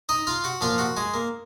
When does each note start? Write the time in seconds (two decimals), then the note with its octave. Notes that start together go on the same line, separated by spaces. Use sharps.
0.09 D#4 D#5
0.27 F4 F5
0.44 F#4 F#5
0.61 A#2 F3 F4 F5
0.78 F#4 F#5
0.97 G#3 G#4
1.14 A#3